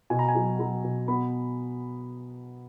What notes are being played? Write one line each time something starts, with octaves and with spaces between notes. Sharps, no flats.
B2 G#5
A#5
G#5
F#3
F#3 A#5
B2
B3 B5